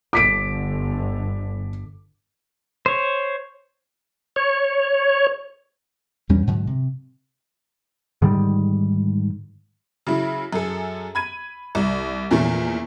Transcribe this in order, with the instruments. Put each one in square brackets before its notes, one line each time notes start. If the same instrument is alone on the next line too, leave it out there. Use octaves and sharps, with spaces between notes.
[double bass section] G1 D3 [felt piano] D6 B6 D7
[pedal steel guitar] C5 C#5
[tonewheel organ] C#5
[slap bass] E2 G3 C#4
G#2 D3 F#3
C3
[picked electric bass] G#2 D3 D#3 G3
[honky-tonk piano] C#3 F#3 E4
F#2 G#4 A4
B5 G#6 D#7
C2
E2 A#2 F3 A3 C#4